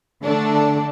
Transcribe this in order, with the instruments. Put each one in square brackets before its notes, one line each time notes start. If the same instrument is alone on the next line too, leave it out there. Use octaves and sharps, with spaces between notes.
[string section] D3 A3 D4